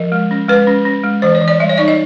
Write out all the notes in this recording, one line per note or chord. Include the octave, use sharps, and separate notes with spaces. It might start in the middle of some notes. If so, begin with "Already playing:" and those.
Already playing: F3 A#4
G#3
C#4
G#3 B4
C#4
C#4
G#3
E3 C5
C#5
E3
D5
G3 E5
C#5
D#4 D5
D#5